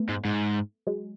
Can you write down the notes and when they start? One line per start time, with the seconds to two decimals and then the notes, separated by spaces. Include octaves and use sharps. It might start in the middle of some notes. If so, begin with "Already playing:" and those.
Already playing: A3 B3
0.09 G#2
0.25 G#2
0.87 F#3 G#3